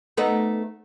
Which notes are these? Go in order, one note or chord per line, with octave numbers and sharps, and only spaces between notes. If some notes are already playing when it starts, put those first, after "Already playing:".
A3 B3 D#4